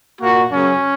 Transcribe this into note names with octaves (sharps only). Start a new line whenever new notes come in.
A#2 A#3 F#4
F#2 C#3 F#3 C#4